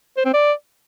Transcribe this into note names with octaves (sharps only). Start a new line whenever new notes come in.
C5
C4
D5